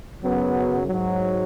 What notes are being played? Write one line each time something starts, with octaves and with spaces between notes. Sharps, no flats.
F#2 C#3 F#3 B3
G#2 F#3